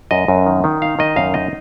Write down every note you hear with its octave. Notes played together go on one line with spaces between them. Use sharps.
F#2 D#5
F#2
D#3
D#3
D#4 F5
D#3 D#5
F#2 F5
D#4 D#5